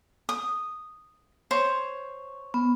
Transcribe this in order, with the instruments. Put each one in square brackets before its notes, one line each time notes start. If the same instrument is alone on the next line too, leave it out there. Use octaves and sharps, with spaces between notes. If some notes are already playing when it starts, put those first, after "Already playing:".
[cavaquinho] D#6
C5 C#5
[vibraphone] B3